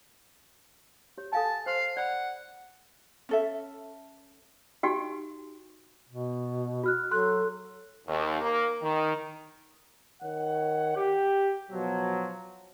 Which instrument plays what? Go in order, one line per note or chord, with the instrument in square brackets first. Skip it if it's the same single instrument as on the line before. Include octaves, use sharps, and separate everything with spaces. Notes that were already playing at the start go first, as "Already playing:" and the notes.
[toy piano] G4 C#5
[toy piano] A4 F5 G#5 [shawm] A5
[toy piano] C5 C6 [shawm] F5
[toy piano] D5 B5 [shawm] F#5
[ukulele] C#4 A4 E5
[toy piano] D#4 F#4 G4 [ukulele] G5
[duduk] B2
[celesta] F#4 F6 F#6
[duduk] F#3 [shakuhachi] A4 [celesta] C6 F#6
[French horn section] D#2
A#3
D#3
[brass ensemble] D#3 C#5 F#5
G4
B2 F3 F#3